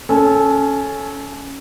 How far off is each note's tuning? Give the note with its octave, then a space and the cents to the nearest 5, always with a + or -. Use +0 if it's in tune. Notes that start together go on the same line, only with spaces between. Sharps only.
C#4 +0 A4 -20